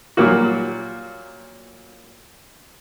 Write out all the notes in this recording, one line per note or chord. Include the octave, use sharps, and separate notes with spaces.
A#2 F#3 G3 A#3 F#4